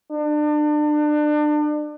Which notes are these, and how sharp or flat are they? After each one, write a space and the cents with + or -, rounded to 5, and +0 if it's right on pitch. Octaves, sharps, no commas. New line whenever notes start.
D4 +30